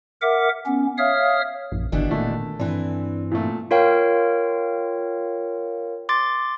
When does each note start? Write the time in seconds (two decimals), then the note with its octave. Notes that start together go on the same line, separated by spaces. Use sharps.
0.21 A#4 E5 F#5 D6
0.66 B3 C#4
0.98 C#5 E5 F5 D#6 F6
1.72 A#1 F#2
1.92 G1 B2 D#3 E3 D4
2.11 A#2 D3 A3
2.59 G2 E3 C4 D4
3.31 A#2 A3
3.71 F4 A#4 C#5 F5 G5
6.09 C6 D6 A6